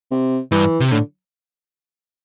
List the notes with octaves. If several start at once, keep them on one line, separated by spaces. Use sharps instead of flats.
C3
G2 E3
C3
A2 D3